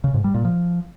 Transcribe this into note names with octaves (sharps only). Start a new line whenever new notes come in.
C#3
G#2
G3
A#2
F3